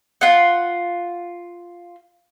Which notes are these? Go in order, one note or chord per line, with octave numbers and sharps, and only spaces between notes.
F4 F#5